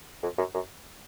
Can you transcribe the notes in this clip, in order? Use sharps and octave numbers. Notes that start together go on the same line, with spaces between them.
F2
F#2
F#2